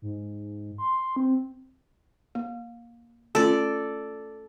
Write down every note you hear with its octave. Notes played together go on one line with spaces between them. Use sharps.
G#2
C6
C4
A#3
A3 C#4 F4 A4 D5